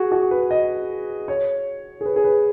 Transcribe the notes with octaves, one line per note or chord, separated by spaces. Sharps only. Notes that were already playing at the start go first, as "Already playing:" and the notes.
Already playing: F#4 G#4
F#4
B4
D#5
C#5
G#4
B4
G#4
B4